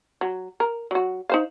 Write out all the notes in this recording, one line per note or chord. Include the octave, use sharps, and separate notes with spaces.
F#3
A#4
F#3 F#4
D#4 C5 F5